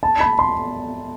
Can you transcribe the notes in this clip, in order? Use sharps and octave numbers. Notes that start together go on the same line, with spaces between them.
A5
B5
C6